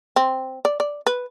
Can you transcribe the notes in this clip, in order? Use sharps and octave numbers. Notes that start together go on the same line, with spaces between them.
C4
D5
D5
B4